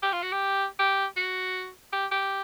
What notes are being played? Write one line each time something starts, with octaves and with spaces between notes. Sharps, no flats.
G4
F4
F#4
G4
G4
F#4
G4
G4